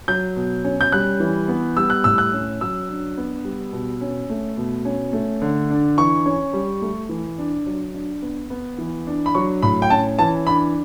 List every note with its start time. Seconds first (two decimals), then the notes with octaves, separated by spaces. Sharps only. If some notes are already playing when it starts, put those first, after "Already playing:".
0.08 F#3 G6
0.36 B2
0.64 C#4
0.81 G6
0.92 G3 F#6
1.20 E3
1.48 B3
1.76 G3 E6
1.90 F#6
2.04 A2 E6
2.18 F#6
2.33 C#4
2.61 F#3 E6
2.89 D4
3.17 B3
3.44 G3
3.72 B2
4.01 C#4
4.30 A3
4.57 B2
4.85 C#4
5.13 A3
5.42 D3
5.70 D4
5.97 E3 C#6
6.26 C#4
6.53 G3
6.82 A3
7.09 E3
7.38 D4
7.66 F#3
7.94 D4
8.22 B3
8.50 B3
8.78 E3
9.07 D4
9.26 B5
9.35 F#3 C#6
9.62 A2 B5
9.82 G5
9.90 C#4 A5
10.19 E3 A5
10.47 D4 B5